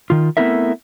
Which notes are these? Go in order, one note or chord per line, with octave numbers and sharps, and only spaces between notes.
D#3 F4
A3 B3 C4 E4 A#4 E5